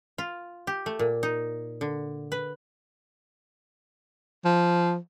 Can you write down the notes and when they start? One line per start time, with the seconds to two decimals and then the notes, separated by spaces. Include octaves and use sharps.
0.18 F4
0.67 G4
0.86 A3
0.99 A#2
1.23 D#4
1.81 D3
2.32 B4
4.45 F3